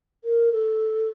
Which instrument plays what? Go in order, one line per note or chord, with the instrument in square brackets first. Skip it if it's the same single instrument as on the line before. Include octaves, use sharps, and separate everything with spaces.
[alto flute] A#4
A4